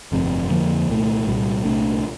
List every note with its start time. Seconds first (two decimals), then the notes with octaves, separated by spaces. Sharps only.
0.12 G1 F2 C3
0.50 F2 D3 F3 A#3
0.88 C2 A#2 A3
1.27 C2 A#2 G3
1.65 C2 A#2 A3 D4